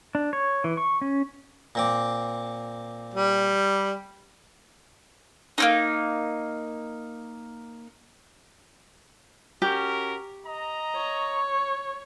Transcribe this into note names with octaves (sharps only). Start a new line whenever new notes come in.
D4
C#5
E3
C#6
C#4
A#2 C4 D6
G3
A#3 C#4 D#4
C#4 F#4 G4 A#4
D#5 A#5
C#5